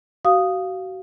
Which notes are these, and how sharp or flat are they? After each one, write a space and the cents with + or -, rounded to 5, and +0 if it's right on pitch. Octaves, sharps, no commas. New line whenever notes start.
F#4 +30 F5 +0 D#6 +0